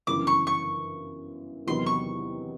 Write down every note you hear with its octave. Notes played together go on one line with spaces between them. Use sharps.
G1 F#2 C#3 E3 D6
C#6
C#6
E2 C3 D#3 F#3 B3 C6
C#6